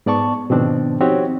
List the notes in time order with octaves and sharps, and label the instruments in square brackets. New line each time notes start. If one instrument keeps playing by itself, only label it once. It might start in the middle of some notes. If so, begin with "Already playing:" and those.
[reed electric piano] G#2 B3 D5 A5 C#6
G#2 B2 D#3 F3 C4 D4
C4 D#4 F#4 G4 C#5